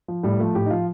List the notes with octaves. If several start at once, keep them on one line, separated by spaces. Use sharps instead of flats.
F3
A2 G3
F3 A3
A2 G4
D#4
F3 F4